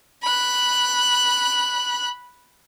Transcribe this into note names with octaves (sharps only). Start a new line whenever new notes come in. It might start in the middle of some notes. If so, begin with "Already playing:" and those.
B5 F#6